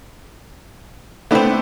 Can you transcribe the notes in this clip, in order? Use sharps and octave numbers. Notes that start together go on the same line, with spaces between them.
A3 B3 C4 D4 B4